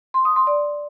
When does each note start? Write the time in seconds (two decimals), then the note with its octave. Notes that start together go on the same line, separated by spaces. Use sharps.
0.14 C6
0.25 D#6
0.36 C6
0.47 D5